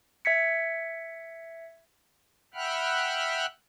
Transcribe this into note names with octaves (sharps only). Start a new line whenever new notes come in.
E5 G#6 B6 C#7
E5 F#5 G5 B5 F6 F#6